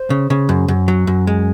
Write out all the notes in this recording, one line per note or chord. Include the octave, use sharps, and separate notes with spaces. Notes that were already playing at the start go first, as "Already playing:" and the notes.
Already playing: C5
C#3
C#3
F#2
F#2
F#3
F#2
G#3